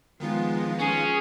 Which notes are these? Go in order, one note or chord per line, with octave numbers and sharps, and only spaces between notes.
D#3 F3 G#3 B3 F4
C#4 G#4